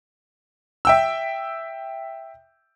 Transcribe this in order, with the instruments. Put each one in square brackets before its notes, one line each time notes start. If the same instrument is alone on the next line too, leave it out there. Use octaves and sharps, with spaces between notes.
[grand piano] E5 G5 E6